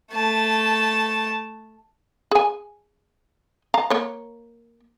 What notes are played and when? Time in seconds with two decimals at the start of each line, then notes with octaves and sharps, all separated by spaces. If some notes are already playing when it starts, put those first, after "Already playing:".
0.12 A3 A5
2.31 G#4 G#5
3.74 F5 A#5
3.90 A#3 C#5